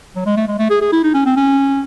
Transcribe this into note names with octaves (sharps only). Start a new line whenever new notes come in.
F#3
G#3
A3
G#3
A3
G#4
G#4
E4
D#4
C#4
C4
C#4